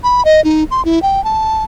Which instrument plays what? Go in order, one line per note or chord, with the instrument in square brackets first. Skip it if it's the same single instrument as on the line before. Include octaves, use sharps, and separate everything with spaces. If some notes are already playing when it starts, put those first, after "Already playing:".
[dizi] B5
D#5
D#4
C6
E4
G5
A5